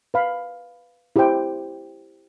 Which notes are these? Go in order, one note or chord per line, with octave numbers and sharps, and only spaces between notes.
B4 F5 B5
E4 G4 C5 G5